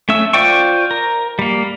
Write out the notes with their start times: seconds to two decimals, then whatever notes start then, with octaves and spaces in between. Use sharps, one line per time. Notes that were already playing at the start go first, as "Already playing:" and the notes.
0.09 A3 C#4 E5 E6
0.33 F4 C5 D5 G5 C#6
0.91 A#4
1.39 G3 A#3